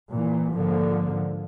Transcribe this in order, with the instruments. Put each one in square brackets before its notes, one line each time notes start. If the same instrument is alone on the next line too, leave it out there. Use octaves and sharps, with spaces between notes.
[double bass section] A#2 E3
G#2 D3 F3 A#3